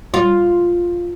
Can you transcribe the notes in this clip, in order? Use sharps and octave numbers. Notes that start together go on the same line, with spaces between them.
F4